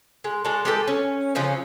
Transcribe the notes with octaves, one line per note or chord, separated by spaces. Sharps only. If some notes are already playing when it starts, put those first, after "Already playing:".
G#3
G#3 D4 F#4 A4
G#3 G4 A4 B4
C#4
C#3 F3 F#3 C#4